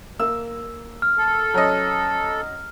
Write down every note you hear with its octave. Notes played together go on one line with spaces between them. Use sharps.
A#3 E6
F6
A4
F#3 C#4 D#5